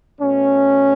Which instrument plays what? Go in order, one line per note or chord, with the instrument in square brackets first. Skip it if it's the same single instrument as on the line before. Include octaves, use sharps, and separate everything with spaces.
[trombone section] B2 A3 C#4